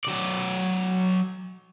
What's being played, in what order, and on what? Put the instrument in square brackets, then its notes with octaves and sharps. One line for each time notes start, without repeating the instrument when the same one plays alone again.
[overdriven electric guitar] F#3 D5